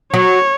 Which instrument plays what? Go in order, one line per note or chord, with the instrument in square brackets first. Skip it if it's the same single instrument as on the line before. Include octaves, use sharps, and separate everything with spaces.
[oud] F#3 [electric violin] C#5